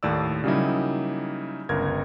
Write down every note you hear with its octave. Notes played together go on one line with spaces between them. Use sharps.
D#2 A2 D5 E6
C#3 F#3 G3 A#3 D#4 E4
G1 C#2 A#4 G#6